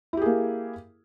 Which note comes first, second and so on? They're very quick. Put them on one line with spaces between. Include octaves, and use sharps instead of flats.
E4 G4 G#4 A#3